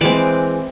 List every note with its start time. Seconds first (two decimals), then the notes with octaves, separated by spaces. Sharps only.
0.01 E3 G#3 C4 D5 D6